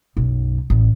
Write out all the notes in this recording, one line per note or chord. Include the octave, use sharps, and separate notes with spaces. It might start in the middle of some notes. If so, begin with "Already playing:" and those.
B1 F#2
A1